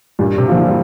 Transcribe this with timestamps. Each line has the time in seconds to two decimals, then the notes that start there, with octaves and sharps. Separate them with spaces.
0.19 G2 A#2
0.38 C3
0.48 D3 F3 A#3 F4
0.57 E3
0.68 G3